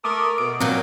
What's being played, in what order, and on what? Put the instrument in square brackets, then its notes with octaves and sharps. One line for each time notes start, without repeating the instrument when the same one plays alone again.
[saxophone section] A3 A4 A#4 [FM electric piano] D6 D#6
[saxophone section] B2 [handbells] D7
[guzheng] A#2 F#3 [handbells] C4